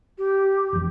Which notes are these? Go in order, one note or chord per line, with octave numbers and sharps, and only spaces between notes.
G4
F1 E2